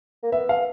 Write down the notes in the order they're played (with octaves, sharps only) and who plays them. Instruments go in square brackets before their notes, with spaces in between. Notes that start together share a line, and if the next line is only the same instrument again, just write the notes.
[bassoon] A#3
[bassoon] B3 [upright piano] E5
[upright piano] F5